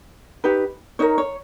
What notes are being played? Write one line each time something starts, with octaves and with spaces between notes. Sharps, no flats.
D#4 G4 B4
D#4 A#4 C#5
C#5